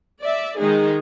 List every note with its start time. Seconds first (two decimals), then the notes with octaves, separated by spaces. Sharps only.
0.20 D5 E5
0.58 D#3 G#3 D#4 G#4